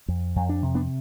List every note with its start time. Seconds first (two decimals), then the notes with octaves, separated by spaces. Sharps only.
0.08 F2
0.36 F2
0.49 D4
0.63 C3
0.75 B3 D4